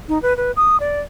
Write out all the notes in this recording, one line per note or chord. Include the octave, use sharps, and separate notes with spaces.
D#4
B4
B4
D#6
D5